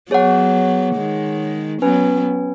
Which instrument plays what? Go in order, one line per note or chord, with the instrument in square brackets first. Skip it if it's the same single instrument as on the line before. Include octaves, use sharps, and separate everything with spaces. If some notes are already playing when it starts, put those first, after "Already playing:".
[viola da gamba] F#3 B3 [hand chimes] G#4 C#5 F#5
[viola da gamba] D#3 G#3
[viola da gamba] F#3 B3 [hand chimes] C#4 B4 G#5